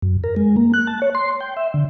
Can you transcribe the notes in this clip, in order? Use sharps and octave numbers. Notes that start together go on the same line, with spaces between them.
F#2
A#4
G#3
A#3
F#6
A5
C#5
C6
G5
E5
D3